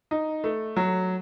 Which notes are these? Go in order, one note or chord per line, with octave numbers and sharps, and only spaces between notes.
D#4
A3
F#3